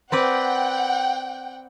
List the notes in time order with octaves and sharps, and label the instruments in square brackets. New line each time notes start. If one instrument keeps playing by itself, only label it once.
[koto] C4 B4 D5 [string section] F#5 G5